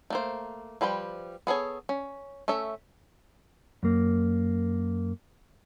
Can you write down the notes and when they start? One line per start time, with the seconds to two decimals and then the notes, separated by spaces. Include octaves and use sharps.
0.10 A3 A#3 C5
0.81 F3 G3 B4 G5
1.47 B3 G#4 A4 C#5
1.89 C#4
2.48 A3 C#4 A4 E5
3.83 F#2 A#3